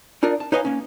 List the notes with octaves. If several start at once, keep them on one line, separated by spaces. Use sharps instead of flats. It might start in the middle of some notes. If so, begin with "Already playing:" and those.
D4 D#4 F4 A#4 D5
A5
D#4 B4 C#5 D#5 F5 G#5
A#3 C#4